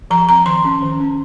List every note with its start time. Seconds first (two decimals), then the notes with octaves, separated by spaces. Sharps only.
0.11 F3 A#5
0.29 C4 A#5
0.46 D#3 C6
0.65 C#4
0.82 D#3
1.00 C#4